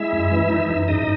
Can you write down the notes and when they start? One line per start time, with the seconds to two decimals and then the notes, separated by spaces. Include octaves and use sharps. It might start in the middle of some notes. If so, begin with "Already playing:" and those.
Already playing: G#3 E4 E5
0.12 F#2
0.31 E3
0.50 D#4
0.69 F#2
0.88 G#2 D#4 D#5